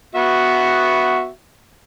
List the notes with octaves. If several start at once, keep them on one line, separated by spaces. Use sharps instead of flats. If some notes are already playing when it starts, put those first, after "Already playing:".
B3 F#4 E5